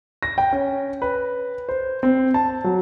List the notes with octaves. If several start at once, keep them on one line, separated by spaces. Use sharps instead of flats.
A#6
G5
C#4
B4
C5
C4
A5
F#3